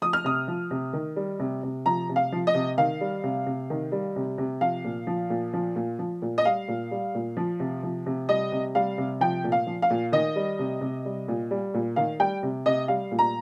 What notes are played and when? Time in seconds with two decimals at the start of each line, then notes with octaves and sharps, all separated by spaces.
0.02 F3 D#6
0.13 F6
0.24 C3 D#6
0.48 F3
0.71 C3
0.93 D#3
1.16 G3
1.40 C3
1.63 C3
1.86 F3 A#5
2.09 C3
2.16 F5
2.32 F3
2.47 D#5
2.54 C3
2.78 D#3 F5
3.01 G3
3.24 C3
3.46 C3
3.70 D#3
3.92 G3
4.16 C3
4.38 C3
4.61 F3 F5
4.84 A#2
5.07 F3
5.30 A#2
5.53 F3
5.76 A#2
5.99 F3
6.22 A#2
6.38 D#5
6.45 G3 F5
6.68 A#2
6.91 G3
7.15 A#2
7.37 F3
7.60 C3
7.83 F3
8.06 C3
8.29 G3 D#5
8.52 C3
8.75 G3 F5
8.98 C3
9.21 F3 G5
9.44 A#2
9.52 F5
9.67 F3
9.82 F5
9.90 A#2
10.12 D#3 D#5
10.36 G3
10.59 C3
10.81 C3
11.05 G3
11.28 A#2
11.51 G3
11.74 A#2
11.96 D#3 F5
12.19 G3 G5
12.43 C3
12.66 C3 D#5
12.88 G3 F5
13.12 A#2
13.19 A#5